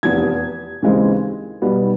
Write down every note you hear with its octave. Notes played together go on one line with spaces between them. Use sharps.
F1 E2 C3 G#6
D#2 C#3 E3 G#3 C4
B1 B2 G3 B3